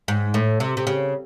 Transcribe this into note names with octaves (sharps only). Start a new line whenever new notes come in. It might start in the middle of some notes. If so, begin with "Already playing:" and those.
G#2
A2
C3
C3
C#3